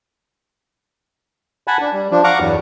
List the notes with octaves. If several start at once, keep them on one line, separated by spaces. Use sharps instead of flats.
F#5 G#5 A5 B5
D4
G3
F3 D4
F5 F#5 A#5 C#6 D6
E2 G2 F#3 G3